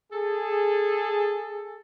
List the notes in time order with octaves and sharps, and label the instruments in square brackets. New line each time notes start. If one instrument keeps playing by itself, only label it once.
[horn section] G#4 A4